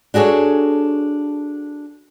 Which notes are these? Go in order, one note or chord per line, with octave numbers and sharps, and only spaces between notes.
D4 F#4 G#4 A4 C#5